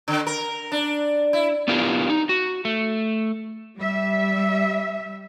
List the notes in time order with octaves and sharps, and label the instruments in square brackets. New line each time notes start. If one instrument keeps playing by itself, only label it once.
[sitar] D3
A#4
D4
E4
[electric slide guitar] B3 D4 E4 F4 G4 A#4
D#4
F#4
A3
[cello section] G3 E5